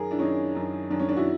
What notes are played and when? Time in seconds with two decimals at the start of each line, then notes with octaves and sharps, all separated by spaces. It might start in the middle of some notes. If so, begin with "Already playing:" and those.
Already playing: F#2 D#3 G#4 A#4
0.11 D4 E4
0.19 F#2 D#3 C#4 D#4
0.55 F#2 D#3
0.90 F#2 D#3 D4
0.99 C#4
1.09 D4
1.17 E4 F#4